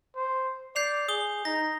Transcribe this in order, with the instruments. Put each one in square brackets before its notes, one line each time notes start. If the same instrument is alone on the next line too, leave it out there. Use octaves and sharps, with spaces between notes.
[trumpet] C5
[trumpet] D5 [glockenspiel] G6 C7 F7
[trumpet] G#4 [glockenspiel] D#6 G7
[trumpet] D#4 [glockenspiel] A#6